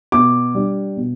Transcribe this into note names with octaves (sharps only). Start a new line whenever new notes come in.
B2 D6
G3 D4
B2